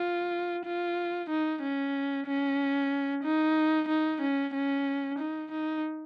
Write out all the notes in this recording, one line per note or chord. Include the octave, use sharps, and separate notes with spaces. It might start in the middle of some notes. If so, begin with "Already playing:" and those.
Already playing: F4
F4
D#4
C#4
C#4
D#4
D#4
C#4
C#4
D#4
D#4